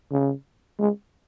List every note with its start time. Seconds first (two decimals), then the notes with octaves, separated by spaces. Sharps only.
0.12 C#3
0.79 G#3